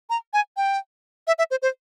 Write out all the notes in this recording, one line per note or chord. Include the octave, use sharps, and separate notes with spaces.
A#5
G#5
G5
E5
E5
C5
C5